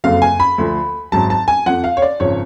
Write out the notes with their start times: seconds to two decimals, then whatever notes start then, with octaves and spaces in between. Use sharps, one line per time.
0.04 F#1 F2 D3 F#3 F5
0.22 G#5
0.40 B5
0.58 D2 D3 F3
1.12 G#1 G#2 F#3 A5
1.30 A5
1.48 G#5
1.66 F2 F3 F#5
1.84 F5
1.97 C#5
2.02 D5
2.20 G#1 C#3 F3 C#5